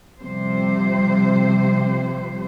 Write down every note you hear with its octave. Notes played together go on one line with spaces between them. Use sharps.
C3 F3 G3 C5